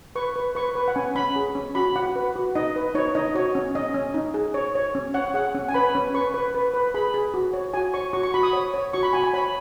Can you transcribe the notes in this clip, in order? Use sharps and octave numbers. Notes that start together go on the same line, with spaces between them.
B4 C#6
B4
B4 C#6
B4
F#5
C#4 G#5
C#4 B5
G#4
C#4
F#4 B5
F#4 F#5
B4
F#4
D#4 D#5
B4
D#4 C#5
D#4 D#5
F#4 C#5
C#4
C#4 D#5
C#4
D#4
G#4
C#5
C#5
C#4
C#5 F#5
G#4 F#5
C#4
G#5
B4 B5
C#4
B4 C#6
B4
B4
B4
G#4 B5
G#4
F#4
C#5
F#4 G#5
C#5 C#6
F#4 C#6
C#6
F#4 B5
D#6
C#5
C#5
F#4 C#6
B5
F#4 G#5
G#5
C#5 B5